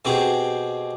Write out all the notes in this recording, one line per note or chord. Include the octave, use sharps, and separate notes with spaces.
B2 C4 G4 G#4